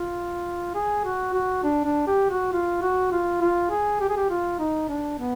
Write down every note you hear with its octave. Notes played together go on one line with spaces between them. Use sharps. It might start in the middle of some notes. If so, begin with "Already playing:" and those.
Already playing: F4
G#4
F#4
F#4
D4
D4
G4
F#4
F4
F#4
F4
F4
G#4
G4
G#4
G4
F4
D#4
D4
B3